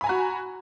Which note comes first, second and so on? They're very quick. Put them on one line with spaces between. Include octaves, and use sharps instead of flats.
B5 G#5 A#5 F#4